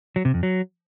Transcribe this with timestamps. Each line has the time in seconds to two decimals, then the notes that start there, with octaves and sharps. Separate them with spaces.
0.16 F#3
0.25 C3
0.34 F2
0.43 F#3